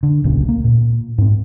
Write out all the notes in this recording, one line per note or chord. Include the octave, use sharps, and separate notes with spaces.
D3
D1 B1 A#2 C#3
A#3
A#2
G#2 C4